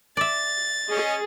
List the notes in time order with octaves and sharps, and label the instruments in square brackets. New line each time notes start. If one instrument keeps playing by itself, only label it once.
[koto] D5 E5 [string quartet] A6
[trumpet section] C#4 D#5 [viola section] G#4